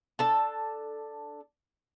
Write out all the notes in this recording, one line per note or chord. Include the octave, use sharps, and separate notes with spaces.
D4 A4 A5